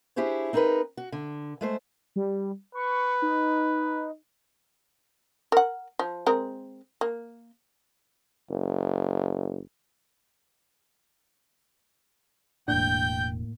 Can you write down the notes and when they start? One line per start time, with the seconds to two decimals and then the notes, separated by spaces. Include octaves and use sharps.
0.16 D4 E4 G4 G#4 C5 C#5
0.53 C4 D#4 G#4 A#4 B4
0.97 F#4
1.12 D3
1.61 G#3 A3 C5
2.16 G3
2.75 B4 C#6
3.22 D#4
5.52 A#4 F#5
5.99 F3
6.26 G#3 C4 A#4
7.01 A#3
8.50 F#1
12.68 E1 A2 A#3 D4 G5 G6